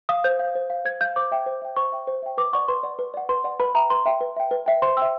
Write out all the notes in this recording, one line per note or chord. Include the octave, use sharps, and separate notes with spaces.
F5 D#6
C5 G6
F5
C5
F5
C5 G#6
F5 G6
C5 D6
E5 G5
C5
E5 G5
C5 C#6
E5 G5
C5
E5 G5
B4 D6
D5 F#5 C#6
B4 C6
D5 F#5
B4
D5 F#5
B4 C6
D5 F#5
B4 B5
E5 G5 A#5
B4 C6
E5 G5
B4
E5 G5
B4
E5 G5
C5 C6
E5 G5 E6